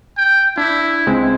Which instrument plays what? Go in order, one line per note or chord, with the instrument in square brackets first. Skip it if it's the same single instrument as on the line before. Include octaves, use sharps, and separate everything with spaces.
[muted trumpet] G5
[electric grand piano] D4 [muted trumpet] E4
[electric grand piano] C#2 G#3 C4